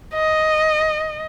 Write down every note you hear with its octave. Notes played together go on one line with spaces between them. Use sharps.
D#5